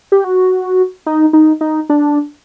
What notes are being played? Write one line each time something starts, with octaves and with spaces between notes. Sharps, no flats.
G4
F#4
D#4
D#4
D#4
D4